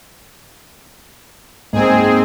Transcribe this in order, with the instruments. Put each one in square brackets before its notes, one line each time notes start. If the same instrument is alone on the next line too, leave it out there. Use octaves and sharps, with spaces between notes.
[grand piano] G#2 A#3 [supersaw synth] C4 G#4